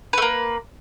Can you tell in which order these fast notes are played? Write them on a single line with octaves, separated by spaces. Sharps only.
B4 A3 A#3